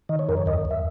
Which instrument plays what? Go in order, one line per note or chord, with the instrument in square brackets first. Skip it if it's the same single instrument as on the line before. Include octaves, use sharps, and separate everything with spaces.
[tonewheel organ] D#3 D#5
C#5
F#2 A#4
C#5
D#2 D#5
D#2
E5